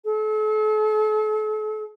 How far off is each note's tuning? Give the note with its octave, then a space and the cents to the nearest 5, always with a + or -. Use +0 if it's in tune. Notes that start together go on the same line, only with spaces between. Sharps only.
A4 -40